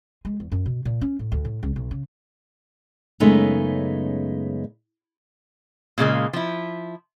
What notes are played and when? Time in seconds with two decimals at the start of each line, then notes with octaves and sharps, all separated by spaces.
0.25 G#3
0.40 E2
0.52 F#2
0.66 B2
0.85 A#2
1.01 C#4
1.19 A2
1.32 D2
1.45 A2
1.63 C#2
1.76 B1
1.91 C#3
3.20 F#2 C#3 G#3 A3 B3 D#4
5.98 A#2 C#3 G#3 A#3
6.33 F3 E4